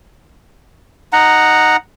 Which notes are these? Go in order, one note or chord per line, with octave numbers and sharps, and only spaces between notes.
D#4 F#5 A#5